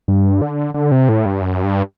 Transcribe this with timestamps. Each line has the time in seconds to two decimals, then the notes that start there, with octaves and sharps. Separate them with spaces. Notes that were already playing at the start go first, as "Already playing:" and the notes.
0.08 G2
0.42 D3
0.74 D3
0.92 C3
1.09 A2
1.26 G2
1.41 F#2
1.64 G2